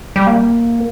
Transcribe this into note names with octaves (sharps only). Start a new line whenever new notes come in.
G3
A#3